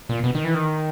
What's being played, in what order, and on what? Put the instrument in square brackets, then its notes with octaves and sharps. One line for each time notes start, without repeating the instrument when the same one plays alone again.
[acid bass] A#2
B2
D#3
E3
D#3